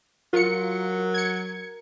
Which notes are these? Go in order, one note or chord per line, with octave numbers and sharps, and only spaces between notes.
F#3 F4 A#4 C#7
G#6 C#7